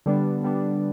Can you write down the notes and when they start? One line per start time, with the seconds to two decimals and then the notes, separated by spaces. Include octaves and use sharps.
0.06 D3 G3 B3 D4
0.42 D3 G3 B3 D4